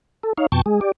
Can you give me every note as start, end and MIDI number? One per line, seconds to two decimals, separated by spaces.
0.23 0.33 69
0.38 0.47 63
0.38 0.47 73
0.38 0.47 77
0.52 0.62 41
0.52 0.62 47
0.52 0.62 79
0.52 0.62 81
0.52 0.62 85
0.66 0.80 56
0.66 0.80 68
0.81 0.92 67
0.81 0.92 74